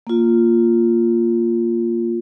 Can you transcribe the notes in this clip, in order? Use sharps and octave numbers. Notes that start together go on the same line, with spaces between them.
A#3 F4